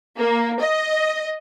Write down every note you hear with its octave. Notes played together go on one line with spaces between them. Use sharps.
A#3
D#5